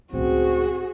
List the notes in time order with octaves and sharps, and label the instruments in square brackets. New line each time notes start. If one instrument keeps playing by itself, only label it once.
[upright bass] C#2 A2 [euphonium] C4 [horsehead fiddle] F#4 G#4